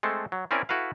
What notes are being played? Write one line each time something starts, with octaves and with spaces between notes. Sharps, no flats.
G#3 A3 C4 A4
F#3
C4 C#4 E4 A#4 D5 G#5
E4 F#4 A4 B4 F5